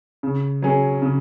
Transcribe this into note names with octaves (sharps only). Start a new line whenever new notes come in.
C#3
F#3 C#4 G#4
C#3